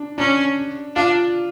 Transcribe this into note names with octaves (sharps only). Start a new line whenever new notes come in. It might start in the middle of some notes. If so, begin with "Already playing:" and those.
Already playing: D4
C#4 D4
D4 F4